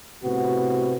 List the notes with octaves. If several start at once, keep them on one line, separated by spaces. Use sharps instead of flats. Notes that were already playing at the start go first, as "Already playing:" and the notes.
A2 C3 B3 F#4